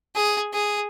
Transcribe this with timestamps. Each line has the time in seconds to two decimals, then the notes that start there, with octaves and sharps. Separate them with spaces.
0.15 G#4
0.53 G#4